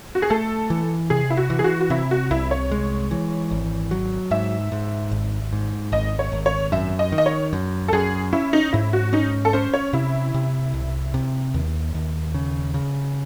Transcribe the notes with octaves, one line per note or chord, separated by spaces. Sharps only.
F#4
G#4
A3 A4
E3
C3 G#4
E4
F#4
E3
G#4
F#4
F#4
C3 E4
F#4
C2 E4
C#5
G#3
E3
G#1
F#3
G#2 E5
G#2
G#1
G#2
G#1 D#5
C#5
G#1
C#5
F#2 E5
D#5
D#3
D#5
C#5
F#2
A4
F#2 G#4
C#4 E4
D#4
G#2 E4
F#4
C#4 D#4
A4
C#4 C5
C#5
C3 E4
C3
C2
C3
D#2
D#2
C#3
C#3